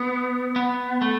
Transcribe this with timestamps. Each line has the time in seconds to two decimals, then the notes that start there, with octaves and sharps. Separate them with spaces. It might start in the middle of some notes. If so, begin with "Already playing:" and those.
Already playing: B3
0.56 B3
1.01 A3